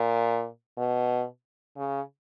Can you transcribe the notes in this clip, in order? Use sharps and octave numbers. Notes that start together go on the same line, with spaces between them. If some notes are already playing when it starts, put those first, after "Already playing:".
Already playing: A#2
B2
C#3